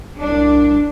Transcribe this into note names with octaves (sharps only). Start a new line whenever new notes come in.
C2 D4